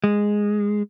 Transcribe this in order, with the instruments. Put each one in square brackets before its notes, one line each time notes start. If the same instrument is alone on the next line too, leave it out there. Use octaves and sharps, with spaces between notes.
[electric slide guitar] G#3